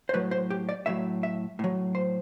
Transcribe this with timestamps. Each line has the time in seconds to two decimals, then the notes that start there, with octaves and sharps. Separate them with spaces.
0.09 C5
0.13 A2 F#3 B4
0.31 C5
0.50 G4
0.69 D5
0.86 A2 F#3 E5
1.23 E5
1.59 A2 F#3
1.95 C5